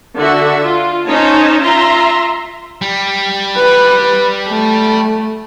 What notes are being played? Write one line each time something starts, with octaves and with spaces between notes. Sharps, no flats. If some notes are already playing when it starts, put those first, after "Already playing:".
D3 F#4 E5
F4
C#4 D#4 C5 C#5 A5
F4 E5 A#5 C6
G3
B4
A3